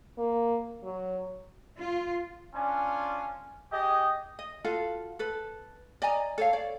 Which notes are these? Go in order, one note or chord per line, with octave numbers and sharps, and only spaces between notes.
A#3
F#3
F4
C#4 D4 F4 G#5
G4 G#4 D#5
D#5
F4 F#4 A4 F5
A4 B4
D5 D#5 G#5 A#5
A4 C#5 F5
C#5 D5